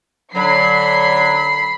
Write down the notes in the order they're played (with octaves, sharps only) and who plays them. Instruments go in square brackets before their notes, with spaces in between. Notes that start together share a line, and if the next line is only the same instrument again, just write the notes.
[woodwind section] D3 F#3 [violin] B5 [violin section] C7